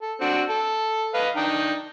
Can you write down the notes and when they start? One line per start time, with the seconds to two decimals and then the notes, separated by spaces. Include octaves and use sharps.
0.02 A4
0.21 C4 D4 F#4
0.49 A4
1.14 B4 D#5 F5
1.36 D4 D#4 G5